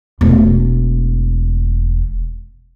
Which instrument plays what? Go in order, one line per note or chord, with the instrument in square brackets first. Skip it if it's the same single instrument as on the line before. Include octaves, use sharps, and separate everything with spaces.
[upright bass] E1 A3